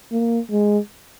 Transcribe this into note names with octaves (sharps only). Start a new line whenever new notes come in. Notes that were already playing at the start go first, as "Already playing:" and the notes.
A#3
G#3